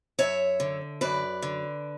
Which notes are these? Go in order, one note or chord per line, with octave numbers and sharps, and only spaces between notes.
F#2 C#5 E5
D3
F#2 B4 D5
D3